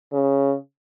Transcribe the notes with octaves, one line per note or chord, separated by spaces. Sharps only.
C#3